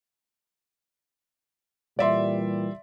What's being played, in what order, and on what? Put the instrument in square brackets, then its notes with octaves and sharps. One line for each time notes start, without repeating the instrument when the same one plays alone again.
[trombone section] A#2 E3 G3 [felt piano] D5 E5 C6